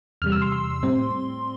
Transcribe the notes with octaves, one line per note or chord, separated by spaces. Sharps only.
E2 C3 G3 F6
E6
C6
C6
A2 G3 C4